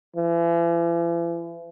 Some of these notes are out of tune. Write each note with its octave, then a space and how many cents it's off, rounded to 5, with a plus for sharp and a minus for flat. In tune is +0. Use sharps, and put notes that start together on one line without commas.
E3 +45